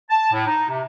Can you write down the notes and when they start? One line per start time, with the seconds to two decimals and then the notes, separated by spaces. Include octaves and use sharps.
0.10 A5
0.32 A2
0.47 D#4
0.69 C3